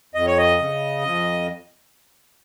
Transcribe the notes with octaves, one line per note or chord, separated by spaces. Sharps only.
F2 D#5
C#5
D#5
C#3
F2